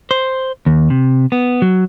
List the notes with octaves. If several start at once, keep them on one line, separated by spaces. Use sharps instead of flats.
C5
D#2
C3
B3
F#3